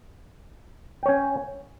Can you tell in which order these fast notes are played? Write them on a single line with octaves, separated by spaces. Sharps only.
G5 C#5 C#4